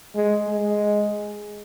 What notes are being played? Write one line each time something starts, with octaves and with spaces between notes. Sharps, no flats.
G#3
G#3